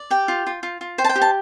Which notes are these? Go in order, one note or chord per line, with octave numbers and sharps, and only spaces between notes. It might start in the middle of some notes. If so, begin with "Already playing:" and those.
Already playing: D5
G4 G5
F4
F4
F4
F4
C5 G5
A5
G5
G4
A5